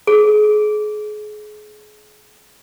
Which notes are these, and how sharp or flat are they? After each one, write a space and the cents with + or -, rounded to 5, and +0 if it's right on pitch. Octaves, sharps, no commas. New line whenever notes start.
G#4 +30